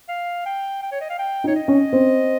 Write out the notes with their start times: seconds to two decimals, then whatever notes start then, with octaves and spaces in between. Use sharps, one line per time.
0.09 F5
0.46 G5
0.82 G5
0.92 C#5
1.01 D#5
1.10 F5
1.19 G5
1.44 D#4
1.47 C#5
1.55 D#5
1.68 C#4
1.93 C4